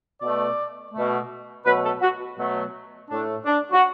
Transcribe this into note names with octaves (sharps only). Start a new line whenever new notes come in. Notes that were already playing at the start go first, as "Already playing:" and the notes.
B2 A3 D5
B2 A3
B2 F#3 A3 B4
A4
F#4
B2 F#3 A3
A2 A3 D4
D4
F#4